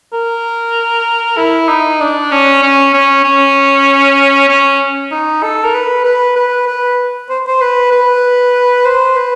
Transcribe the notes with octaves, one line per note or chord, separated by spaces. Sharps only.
A#4
E4
D#4
D4
C#4
C#4
C#4
C#4
C#4
D#4
A4
A#4
B4
B4
B4
B4
C5
C5
B4
B4
C5
B4